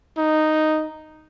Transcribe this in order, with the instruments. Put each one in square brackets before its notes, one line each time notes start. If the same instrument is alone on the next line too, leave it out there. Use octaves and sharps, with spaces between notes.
[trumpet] D#4